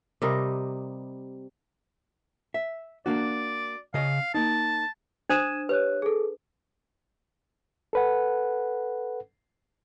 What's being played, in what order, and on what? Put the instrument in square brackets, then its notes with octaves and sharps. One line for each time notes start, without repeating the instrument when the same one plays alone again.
[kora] C3 G3 A#4 D#5
[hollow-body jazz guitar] E5
[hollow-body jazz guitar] A#3 D4 F#4 [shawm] D5
[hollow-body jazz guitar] C#3 D#5 [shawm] F5
[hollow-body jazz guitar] A#3 D#4 [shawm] A5
[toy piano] D4 C5 D#6 [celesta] G#6 D#7 E7
[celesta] G4 C#5 F#6 [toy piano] B4
[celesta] G#4 A4
[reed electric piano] A4 B4 F#5